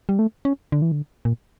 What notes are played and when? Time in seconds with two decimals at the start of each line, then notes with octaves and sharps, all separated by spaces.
0.09 G3
0.19 A3
0.45 C#4
0.72 D3
0.82 E3
0.92 D3
1.25 A#2